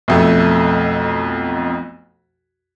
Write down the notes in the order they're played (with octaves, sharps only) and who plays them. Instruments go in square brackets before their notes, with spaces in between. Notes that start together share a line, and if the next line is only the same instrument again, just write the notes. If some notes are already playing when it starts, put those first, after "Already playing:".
[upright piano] B1 F2 A3